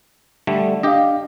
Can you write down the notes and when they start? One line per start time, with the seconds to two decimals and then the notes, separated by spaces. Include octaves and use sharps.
0.47 D3 G3 A3
0.83 D4 G4 D#5 F5